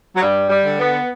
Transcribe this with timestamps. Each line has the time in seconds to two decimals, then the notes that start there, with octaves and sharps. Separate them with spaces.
0.15 F#3
0.22 G2 G3
0.50 G3
0.64 D3
0.79 B3